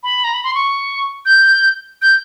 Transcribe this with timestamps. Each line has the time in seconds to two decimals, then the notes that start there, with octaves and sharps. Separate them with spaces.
0.03 B5
0.24 A#5
0.34 B5
0.44 C6
0.55 C#6
1.26 G6
2.02 G6